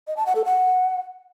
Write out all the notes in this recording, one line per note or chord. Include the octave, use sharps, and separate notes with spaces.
D#5
A5
F#5
A4
F#5